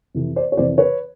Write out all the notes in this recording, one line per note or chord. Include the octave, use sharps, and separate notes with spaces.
F2 C3 E3
C5 D5
C#5
F2 C3 E3 C5 D5
B4 C#5